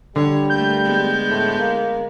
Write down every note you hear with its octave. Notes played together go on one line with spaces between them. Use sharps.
D3 G3 C#5
A3 A#3 G6
G#3 B3
A2
A#3